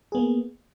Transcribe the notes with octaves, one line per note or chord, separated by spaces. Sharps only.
A#3 B3 G#4